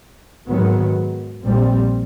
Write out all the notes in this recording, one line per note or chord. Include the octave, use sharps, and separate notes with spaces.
G#2 D#3 F#3 B3
A#1 A#2 G3 C4